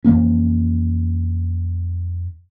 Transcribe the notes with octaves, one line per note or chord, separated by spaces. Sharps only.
F2 E3 A#3 C#4